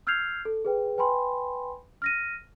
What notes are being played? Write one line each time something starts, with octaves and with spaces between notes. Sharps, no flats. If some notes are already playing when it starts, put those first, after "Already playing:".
E6 F6 G6 G#6 C7 F7
A4
G#4 B4 G5
B4 G5 G#5 B5 C6
F6 A#6 D#7